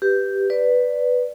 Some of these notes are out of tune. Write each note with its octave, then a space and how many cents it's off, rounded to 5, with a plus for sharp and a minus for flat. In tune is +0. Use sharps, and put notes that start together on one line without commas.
G4 +0 B4 +0
B4 +5 D5 +0